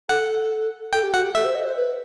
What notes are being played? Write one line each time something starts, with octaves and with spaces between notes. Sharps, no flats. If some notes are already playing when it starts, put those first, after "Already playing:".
A4 F#5
A4 G5
G4
F#4 F#5
G4
A4 E5
C5
D#5
C5
B4